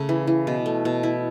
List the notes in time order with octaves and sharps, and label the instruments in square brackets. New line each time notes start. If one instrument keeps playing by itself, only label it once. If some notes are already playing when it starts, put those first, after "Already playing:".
Already playing: [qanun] C#3 A3
E3
E3
B2
A3
B2
E4